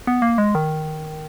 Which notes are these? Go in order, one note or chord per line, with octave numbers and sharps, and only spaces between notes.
B3
A#3
G#3
D#3